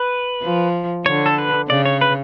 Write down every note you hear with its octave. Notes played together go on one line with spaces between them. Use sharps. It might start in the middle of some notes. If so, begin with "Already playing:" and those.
Already playing: B4
F3
D3 C#5
A4
B4
C#3 D5
C#5
B4